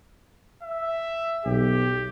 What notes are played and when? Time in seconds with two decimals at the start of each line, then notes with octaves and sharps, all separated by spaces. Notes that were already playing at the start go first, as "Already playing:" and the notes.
0.63 E5
1.46 B1 G4